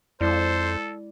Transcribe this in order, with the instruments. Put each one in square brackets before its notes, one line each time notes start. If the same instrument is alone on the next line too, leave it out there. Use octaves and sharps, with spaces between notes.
[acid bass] F2 [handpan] G#3 E4 D5 [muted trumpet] A4 [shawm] C5